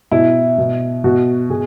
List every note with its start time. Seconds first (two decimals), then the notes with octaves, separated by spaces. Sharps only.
0.12 B2 E4
0.58 B2
1.04 B2 F#4
1.50 B2 G#4